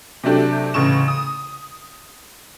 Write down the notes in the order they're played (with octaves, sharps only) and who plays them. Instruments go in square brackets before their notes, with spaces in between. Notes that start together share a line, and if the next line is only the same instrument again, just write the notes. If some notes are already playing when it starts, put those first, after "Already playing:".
[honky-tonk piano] C3 F#3 A3 D4 G4
A1 C#3 C#6 E7
D#6